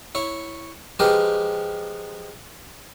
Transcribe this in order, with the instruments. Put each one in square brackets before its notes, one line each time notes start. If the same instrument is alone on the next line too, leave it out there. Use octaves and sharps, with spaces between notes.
[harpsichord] E4 C#5
F3 G#3 G4 A#4 B4